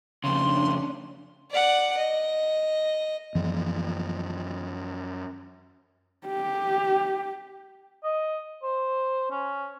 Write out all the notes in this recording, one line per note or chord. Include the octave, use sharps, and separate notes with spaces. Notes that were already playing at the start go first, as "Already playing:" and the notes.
F2 C#3 C#4 D4 C6
D5 F#5
D#5
F#2 E3 F3
G4
D#5
C5
C#4